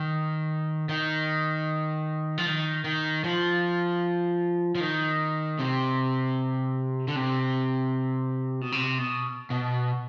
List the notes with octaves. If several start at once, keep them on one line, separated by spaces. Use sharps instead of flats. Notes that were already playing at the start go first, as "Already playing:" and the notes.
Already playing: D#3
D#3
F3
D#3
D#3
F3
F3
D#3
C3
D3
C3
B2
C3
B2
B2